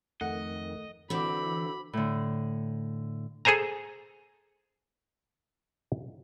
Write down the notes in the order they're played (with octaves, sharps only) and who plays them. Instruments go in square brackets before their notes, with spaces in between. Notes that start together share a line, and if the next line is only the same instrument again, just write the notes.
[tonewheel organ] F2 D#3 [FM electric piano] A3 [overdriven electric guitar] D#5 [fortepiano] F#5
[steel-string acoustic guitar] D3 C4 [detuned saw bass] E3 [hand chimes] F#4 D6 [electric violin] B5
[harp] A2 D3
[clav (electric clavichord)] G#4 A4 C5 G#5 A#5